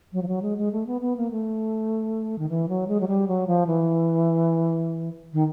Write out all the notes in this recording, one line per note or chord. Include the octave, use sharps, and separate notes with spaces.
F#3
F3
F#3
G#3
G#3
A3
B3
B3
A#3
A3
D#3
E3
F#3
G#3
F#3
G3
F#3
F3
E3
D#3